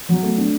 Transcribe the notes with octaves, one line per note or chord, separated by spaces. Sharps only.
F#3
A3
D4